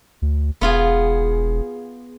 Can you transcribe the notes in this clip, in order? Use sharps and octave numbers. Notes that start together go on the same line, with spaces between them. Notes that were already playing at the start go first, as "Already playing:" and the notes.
D2
E1 B3 F4 G#4